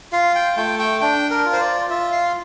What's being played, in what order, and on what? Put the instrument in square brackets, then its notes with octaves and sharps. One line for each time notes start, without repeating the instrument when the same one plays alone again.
[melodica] F4 F5
G5
A3 G5
G5
D4 G5
A#4
F4
C5
D5
F4 E5
F5